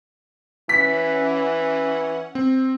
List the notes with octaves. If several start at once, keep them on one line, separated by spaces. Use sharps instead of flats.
E3 C#4 F#5 B6
C4